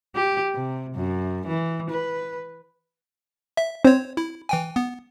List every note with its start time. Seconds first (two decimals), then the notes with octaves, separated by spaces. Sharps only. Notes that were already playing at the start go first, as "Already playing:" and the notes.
0.16 G4
0.55 C3
0.95 F#2
1.47 E3
1.90 B4
3.57 E5
3.84 C4 C5 C#5
4.17 E4
4.49 E3 G5 G#5
4.76 B3